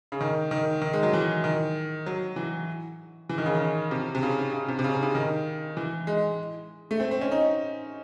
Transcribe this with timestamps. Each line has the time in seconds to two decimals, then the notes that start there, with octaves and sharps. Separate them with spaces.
0.12 C#3
0.21 D#3
0.51 D#3
0.82 D#3
0.93 G#3
1.03 F#3
1.13 E3
1.44 D#3
2.06 F#3
2.36 E3
3.29 E3
3.38 D#3
3.46 C#3
3.55 D#3
3.91 C3
4.15 C3
4.23 C#3
4.53 C#3
4.68 C3
4.79 C3
4.84 C#3
5.03 C#3
5.15 D#3
5.77 E3
6.07 G#3
6.91 A3
7.00 C4
7.11 C4
7.21 C#4
7.31 D#4